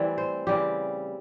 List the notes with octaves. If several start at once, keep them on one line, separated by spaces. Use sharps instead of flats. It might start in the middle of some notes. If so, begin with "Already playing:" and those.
Already playing: E3 G3 A3 C4
C5
C#3 E3 G3 C4 G4